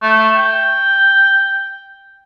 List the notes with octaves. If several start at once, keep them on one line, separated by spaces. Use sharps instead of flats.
A3
G5